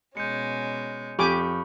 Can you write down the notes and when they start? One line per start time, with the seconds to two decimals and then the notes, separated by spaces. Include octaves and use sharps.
0.17 B2 G#3 C#4 G6 C#7
1.19 F2 G4 G#5 B5 C#6 D6